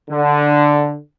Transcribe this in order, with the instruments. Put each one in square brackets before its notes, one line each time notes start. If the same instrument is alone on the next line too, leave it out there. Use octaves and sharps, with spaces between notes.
[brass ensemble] D3